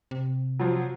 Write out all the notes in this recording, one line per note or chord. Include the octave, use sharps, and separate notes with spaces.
C3
F3 F#3